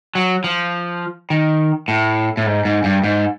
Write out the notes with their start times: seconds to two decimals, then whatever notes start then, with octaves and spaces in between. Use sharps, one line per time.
0.15 F#3
0.44 F3
1.30 D#3
1.88 A2
2.37 A2
2.46 G#2
2.65 G#2
2.84 G2
3.04 G#2